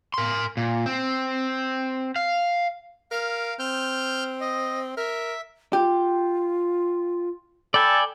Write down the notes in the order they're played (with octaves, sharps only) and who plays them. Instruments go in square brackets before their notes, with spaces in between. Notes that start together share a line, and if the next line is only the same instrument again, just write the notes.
[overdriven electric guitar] A#4 C6
A#2
C4
F5
[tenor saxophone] A#4 [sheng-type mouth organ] F5
[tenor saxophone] C4 [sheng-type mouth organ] F6 G6
[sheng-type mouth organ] D#5
[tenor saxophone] A#4 [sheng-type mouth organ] E5
[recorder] F4 [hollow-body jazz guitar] G4
[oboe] A4 [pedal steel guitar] D5 G5 G#5 [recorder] B5